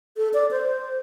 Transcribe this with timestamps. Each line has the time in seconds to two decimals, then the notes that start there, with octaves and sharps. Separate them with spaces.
0.17 A4
0.34 D5
0.51 C5